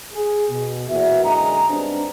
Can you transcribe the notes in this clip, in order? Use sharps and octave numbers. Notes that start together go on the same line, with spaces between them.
G#4
B2
E2 A#2 F#4 E5
F#2 D3 G#3 G#4 A#5
G#2 G3 B3 C4 D4